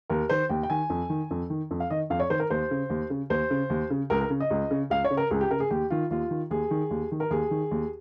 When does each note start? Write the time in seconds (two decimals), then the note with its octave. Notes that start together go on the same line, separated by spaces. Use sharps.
0.10 D#2 A#4
0.29 D#3 C5
0.50 D#2 G5
0.63 G5
0.70 D#3 G#5
0.90 F2
1.09 D#3
1.31 F2
1.50 D#3
1.71 F2
1.80 F5
1.90 D#3 D#5
2.10 F2 F5
2.20 C#5
2.30 D#3 C5
2.40 A#4
2.50 D#2 C5
2.71 C#3
2.90 D#2
3.10 C#3
3.30 D#2 C5
3.50 C#3
3.70 D#2
3.90 C#3
4.10 C#2 A#4
4.21 A#4
4.30 C#3
4.40 D#5
4.50 C#2
4.71 C#3
4.90 C#2 F5
5.04 C#5
5.11 C#3
5.17 A#4
5.30 C#2 G#4
5.41 G4
5.51 C#3 A#4
5.60 G#4
5.70 D#2 G4
5.90 D#3 F4
6.10 D#2 F4
6.30 D#3
6.50 D#2 G#4
6.71 D#3
6.91 D#2
7.11 D#3
7.20 A#4
7.30 D#2 G#4
7.51 D#3
7.71 D#2